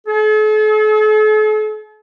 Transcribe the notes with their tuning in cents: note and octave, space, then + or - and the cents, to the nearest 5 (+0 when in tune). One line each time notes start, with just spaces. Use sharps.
A4 -45